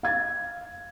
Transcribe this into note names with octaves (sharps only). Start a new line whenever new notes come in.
F5 G#6 A6